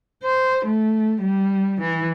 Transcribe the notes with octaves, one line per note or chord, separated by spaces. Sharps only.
C5
A3
G3
E3